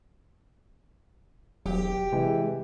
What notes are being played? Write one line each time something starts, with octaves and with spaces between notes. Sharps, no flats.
E1 F#3 G4
C3 E3 G#3